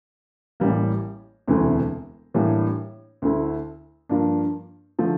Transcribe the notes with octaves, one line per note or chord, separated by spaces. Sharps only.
A1 A2 E3 G3 A#3
E1 D2 C3 E3 A3
A2 E3 G3 A#3 D4
D2 D3 A3 E4
G2 F3 A#3 D4
D3 F3 A3